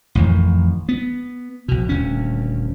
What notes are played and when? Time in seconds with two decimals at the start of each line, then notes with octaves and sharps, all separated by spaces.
0.15 A1 F2 D#3
0.89 B3
1.68 A#1 B2
1.89 D#1 D2 C#4